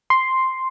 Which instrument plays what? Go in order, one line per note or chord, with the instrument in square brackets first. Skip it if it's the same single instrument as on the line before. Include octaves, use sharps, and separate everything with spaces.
[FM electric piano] C6